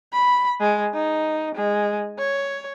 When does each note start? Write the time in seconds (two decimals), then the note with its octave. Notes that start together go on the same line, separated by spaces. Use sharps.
0.13 B5
0.60 G#3
0.94 D#4
1.55 G#3
2.18 C#5